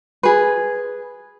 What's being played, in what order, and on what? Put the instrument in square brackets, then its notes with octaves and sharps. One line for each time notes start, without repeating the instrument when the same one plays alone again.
[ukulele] G#4 B4